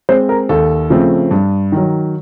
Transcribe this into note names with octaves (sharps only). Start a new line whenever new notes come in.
G#3 C4 C5
A#4
D#2 A4
C#3 F3 A3 C4
G2
D#3 F#3